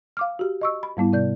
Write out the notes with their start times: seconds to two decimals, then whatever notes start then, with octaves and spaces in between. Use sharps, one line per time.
0.17 F5 D6 F6
0.39 F#4 G4
0.61 D#5 C#6 E6
0.83 B5
0.97 G#2 G3 B3 E4
1.13 C3 D5 G6